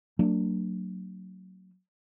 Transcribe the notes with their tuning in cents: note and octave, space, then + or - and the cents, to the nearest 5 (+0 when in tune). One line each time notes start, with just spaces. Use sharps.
F#3 +10 A#3 -40 D4 +0